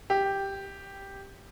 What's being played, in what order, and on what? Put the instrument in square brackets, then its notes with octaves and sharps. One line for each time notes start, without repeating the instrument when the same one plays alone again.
[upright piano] G4